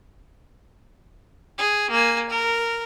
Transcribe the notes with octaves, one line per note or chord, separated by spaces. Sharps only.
G#4
A#3 G#5
A#4